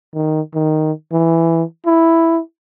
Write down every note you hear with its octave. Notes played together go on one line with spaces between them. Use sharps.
D#3
D#3
E3
E4